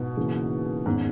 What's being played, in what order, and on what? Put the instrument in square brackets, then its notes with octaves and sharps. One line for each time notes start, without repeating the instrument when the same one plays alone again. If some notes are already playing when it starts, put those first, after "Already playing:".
Already playing: [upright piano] G#2 B2
[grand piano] C#3 E3 A#3
[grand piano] E2 D#3 G#3 C#4 [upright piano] G#2